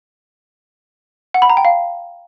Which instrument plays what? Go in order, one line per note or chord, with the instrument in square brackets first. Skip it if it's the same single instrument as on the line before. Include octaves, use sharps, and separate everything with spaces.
[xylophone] F#5
B5
A#5
G5
F5